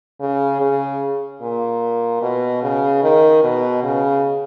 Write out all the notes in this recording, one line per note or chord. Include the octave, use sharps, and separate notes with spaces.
C#3
C#3
A#2
B2
C#3
D#3
B2
C#3